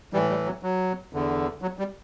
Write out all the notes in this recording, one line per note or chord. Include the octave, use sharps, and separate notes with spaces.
A2 E3 G3
G3
F#3
F#3
E2 D3
F#3
G3